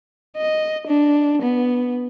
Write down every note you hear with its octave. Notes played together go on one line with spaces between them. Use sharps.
D#5
D4
B3